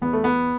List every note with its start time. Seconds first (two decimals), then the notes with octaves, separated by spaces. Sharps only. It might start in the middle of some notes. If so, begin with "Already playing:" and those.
0.02 E2 B3
0.13 A3
0.24 B3